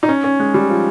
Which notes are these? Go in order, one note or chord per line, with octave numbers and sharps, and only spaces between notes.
D#4
C#4
C#4
G#3
G3
F3